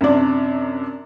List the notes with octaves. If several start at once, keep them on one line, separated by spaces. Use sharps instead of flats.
F#2 C3 D4